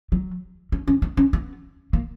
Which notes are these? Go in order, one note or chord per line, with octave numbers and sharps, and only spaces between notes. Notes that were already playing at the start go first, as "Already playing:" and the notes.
F#3
C#4
C#4
B3
C#4
B3
A#3